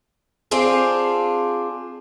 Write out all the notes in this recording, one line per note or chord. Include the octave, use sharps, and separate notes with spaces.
C4 D4 F4 G#4